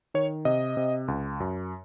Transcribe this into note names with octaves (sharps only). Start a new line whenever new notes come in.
D#3 C#5
C3 D#5
C3
C#2
F#2